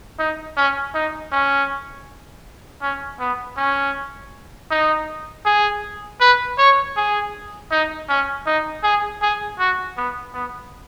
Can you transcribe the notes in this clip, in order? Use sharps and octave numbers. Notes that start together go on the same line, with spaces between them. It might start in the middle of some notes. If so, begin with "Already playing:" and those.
D#4
C#4
D#4
C#4
C#4
B3
C#4
D#4
G#4
B4
C#5
G#4
D#4
C#4
D#4
G#4
G#4
F#4
B3
B3